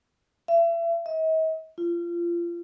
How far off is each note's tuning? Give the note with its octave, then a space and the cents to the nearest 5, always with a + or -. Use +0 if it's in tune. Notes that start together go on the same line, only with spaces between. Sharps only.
E5 +35
D#5 +45
F4 -25